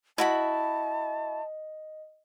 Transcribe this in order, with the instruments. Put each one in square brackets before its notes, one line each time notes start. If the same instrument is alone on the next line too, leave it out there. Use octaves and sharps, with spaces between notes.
[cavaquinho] E4 F#4 B5 [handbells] D#5 [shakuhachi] A5